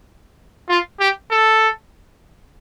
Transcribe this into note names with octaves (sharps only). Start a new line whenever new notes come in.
F4
G4
A4